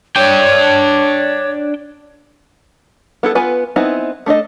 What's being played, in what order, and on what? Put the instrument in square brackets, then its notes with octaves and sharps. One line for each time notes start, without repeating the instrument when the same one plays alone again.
[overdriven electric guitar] D4 G5 [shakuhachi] C#5
[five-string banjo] B3 E4 A4
B3 F4 B4 G#5
B3 C4 D#4 E4 G#5
A3 D4 A4 D#5